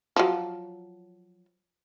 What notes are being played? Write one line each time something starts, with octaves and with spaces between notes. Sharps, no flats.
F3 F#3